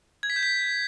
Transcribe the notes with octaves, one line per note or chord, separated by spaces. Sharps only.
G#6
B6
G6
B6